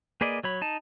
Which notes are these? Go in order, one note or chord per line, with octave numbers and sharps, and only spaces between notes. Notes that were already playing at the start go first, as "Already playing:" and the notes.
A#3 G#4 B4 D5 D#5
F#3 C#5 B5
D#4 A5